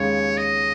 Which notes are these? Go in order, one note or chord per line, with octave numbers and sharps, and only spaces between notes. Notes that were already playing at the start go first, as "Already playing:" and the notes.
Already playing: D#2 C#3 G#3 C#4 C#5
D#5